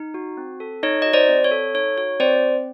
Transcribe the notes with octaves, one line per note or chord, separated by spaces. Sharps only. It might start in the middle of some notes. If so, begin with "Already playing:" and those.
Already playing: D#4
F#4
C4
A4
D#4 C#5 D#5
F#4 D#5
C5 D5
C4
C#5
A4
D#4 C#5
F#4 C#5
C4 C5 D5